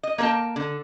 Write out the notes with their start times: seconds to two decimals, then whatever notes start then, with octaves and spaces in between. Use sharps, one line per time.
0.03 D#5
0.18 A#3 A#4 B4 G5 A5
0.56 D3